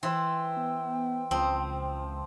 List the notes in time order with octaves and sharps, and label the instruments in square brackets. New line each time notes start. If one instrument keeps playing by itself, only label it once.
[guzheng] E3 [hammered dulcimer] C5 E5 C6 [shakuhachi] G5
[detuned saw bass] B3
[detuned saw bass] C#2 [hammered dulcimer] F3 C5 [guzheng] C4